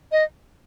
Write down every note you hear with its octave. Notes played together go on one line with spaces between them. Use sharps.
D#5